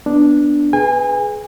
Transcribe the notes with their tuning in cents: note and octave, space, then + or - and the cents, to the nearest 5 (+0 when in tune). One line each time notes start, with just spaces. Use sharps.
B3 +0 D4 +0
G#4 +20 B4 +5 G#5 -35